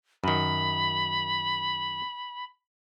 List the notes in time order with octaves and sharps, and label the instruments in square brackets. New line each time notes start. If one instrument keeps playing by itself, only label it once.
[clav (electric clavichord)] F#2 D#3 [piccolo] B5